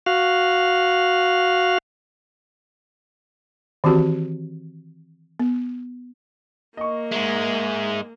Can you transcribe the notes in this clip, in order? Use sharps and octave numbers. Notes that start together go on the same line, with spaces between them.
F#4 F5
D#3 E3 C4 F#4 G4
B3
A#3 D#5 C#6
G#2 G#3 E5